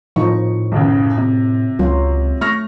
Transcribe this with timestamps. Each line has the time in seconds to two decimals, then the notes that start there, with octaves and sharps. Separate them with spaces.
0.16 A2 F3 D#4 C#6
0.72 B1 F#2 C#3
1.17 C3
1.79 C#2 F#3 F4
2.41 A3 C#6 F6 A#6